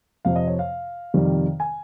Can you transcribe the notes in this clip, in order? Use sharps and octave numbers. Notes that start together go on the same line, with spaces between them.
F2 C3 F3 F5
D#5
C#5
F5
F2 C3 D#3 G3
G#5